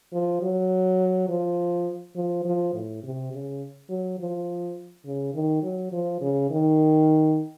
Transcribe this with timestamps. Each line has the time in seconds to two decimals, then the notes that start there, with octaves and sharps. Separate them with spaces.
0.13 F3
0.42 F#3
1.29 F3
2.16 F3
2.45 F3
2.74 A2
3.03 C3
3.32 C#3
3.89 F#3
4.19 F3
5.06 C#3
5.34 D#3
5.63 F#3
5.92 F3
6.21 C#3
6.50 D#3